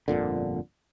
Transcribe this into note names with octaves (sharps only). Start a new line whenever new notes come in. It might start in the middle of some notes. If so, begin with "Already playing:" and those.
G1 F2 A#2 D3